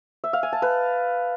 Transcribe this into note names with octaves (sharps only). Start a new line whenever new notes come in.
E5
F5
G#5
A5
B4